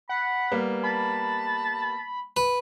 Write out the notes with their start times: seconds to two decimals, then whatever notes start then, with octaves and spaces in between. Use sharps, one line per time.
0.09 F#5 B5
0.51 G3 A#3 B3
0.83 A5 B5
2.37 B4